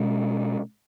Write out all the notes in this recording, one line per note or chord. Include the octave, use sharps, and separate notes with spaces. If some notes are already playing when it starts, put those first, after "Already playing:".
Already playing: B2 G#3 C#4